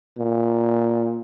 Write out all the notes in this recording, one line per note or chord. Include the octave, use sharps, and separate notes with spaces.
A#2